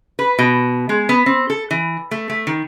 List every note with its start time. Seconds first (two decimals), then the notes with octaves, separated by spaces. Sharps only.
0.19 B4
0.39 B2
0.89 G#3
1.09 B3
1.26 C4
1.50 A4
1.71 E3
2.11 A3
2.30 A3
2.47 D#3